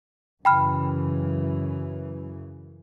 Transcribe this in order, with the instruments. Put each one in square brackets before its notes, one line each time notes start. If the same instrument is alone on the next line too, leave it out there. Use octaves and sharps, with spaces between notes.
[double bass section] F#2 C#3 E3 [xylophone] G5 B5 F6